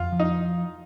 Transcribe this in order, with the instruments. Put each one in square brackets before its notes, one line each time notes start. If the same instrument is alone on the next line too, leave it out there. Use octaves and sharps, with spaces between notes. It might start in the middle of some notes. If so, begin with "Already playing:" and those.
Already playing: [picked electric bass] F2 [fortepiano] F4
[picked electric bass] F3
[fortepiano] D#4